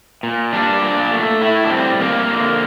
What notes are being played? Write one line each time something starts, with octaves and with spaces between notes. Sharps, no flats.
A#2
G3 D4
A#2
A3
A2 E4
D4
G3 C4
F2 A#3
D3